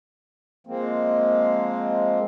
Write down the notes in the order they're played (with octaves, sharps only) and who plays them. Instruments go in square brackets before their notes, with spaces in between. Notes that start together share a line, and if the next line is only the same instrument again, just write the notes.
[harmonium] F3 G#3 A#3 C4